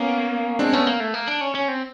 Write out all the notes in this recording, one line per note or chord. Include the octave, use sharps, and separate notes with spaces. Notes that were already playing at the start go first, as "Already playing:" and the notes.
Already playing: A#3 B3 C#4
G#3 C4 D4
A3 B3 C#4
A#3
A3
A#3
D4
C#4
C#4
C4